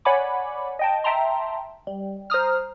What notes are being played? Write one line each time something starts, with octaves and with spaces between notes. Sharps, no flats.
C#5 D5 F#5 G#5 B5 D6
D#5 G5 A5
E5 G5 A5 A#5 C6
G3
C5 A#5 D#6 F6